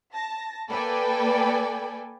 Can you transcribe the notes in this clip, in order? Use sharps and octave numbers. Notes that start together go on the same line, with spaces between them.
A5 A#6
A#3 A4 B4 D5 G5 G#5